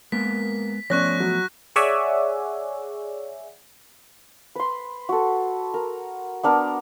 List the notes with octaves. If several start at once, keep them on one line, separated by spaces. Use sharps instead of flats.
G#3 A#3 B3 A#4 B6
F3 A3 B3 C#4 D5 C#6 F#6 A#6
F#3
G#4 C#5 D5 E5 F#5 G#5
B4 C6
F#4 A4
A#4
B3 D4 A#4 A5